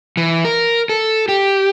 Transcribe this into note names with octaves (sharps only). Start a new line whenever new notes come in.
E3
A#4
A4
G4